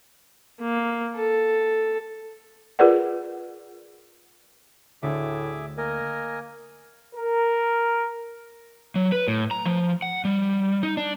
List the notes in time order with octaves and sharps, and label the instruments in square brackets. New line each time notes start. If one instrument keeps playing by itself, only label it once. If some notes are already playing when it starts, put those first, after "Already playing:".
[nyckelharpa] A#3
A4
[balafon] F4 G#4 A#4 B4 D5 F#5
[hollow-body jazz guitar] D2 D3 [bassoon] A2 [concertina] G#4 E5 D6
[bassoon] A#3 [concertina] A#4 D#5 G#5
[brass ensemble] A#4
[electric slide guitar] F#3
B4
A2
A#5
F3
F#5
G3
D#4
D4